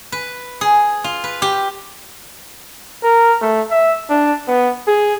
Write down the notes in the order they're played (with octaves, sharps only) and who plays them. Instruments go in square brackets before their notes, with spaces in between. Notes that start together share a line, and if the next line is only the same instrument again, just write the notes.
[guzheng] B4
G#4
F4
B4
G4
[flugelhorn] A#4
A3
E5
D4
B3
G#4